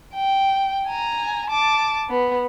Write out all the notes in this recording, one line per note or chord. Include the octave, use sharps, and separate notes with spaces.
G5
G#5 A#5
A5 D6
B3